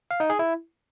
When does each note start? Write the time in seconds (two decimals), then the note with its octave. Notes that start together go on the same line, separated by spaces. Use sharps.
0.11 F5
0.20 D#4
0.30 G#4
0.39 E4